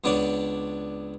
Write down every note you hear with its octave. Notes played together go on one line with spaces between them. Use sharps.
C#2 B3 D4 C#5 D5